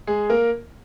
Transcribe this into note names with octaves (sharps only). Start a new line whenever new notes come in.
G#3 G#4
A#3 A#4